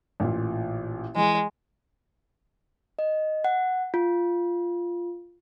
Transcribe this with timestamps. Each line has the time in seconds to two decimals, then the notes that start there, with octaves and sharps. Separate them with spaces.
0.20 A1 A#2
1.16 E3 G#3
2.99 D#5
3.44 F#5
3.94 F4